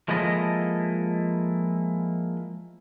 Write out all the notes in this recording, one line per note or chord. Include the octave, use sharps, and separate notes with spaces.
F3 G#3 A#3 E4 A4 D#5